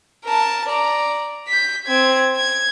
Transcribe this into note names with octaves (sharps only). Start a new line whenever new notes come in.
A#4 A5
D5 A#5
G6 B6
C4 G#6
G#6